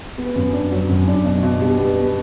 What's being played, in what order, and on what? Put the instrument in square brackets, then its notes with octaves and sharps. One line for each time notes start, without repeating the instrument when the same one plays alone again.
[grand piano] B3
F#2
D4
F#3
F#2
D4
B2
B2
G3
B3
B3